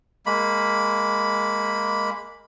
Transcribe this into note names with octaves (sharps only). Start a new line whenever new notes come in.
G#3 A#3 B5